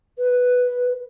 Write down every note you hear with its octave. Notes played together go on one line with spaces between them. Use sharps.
B4